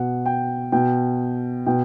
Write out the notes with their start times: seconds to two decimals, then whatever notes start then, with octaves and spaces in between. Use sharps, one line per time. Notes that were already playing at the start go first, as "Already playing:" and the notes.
Already playing: B2 F#5
0.26 G5
0.72 B2 G5
1.66 B2 G5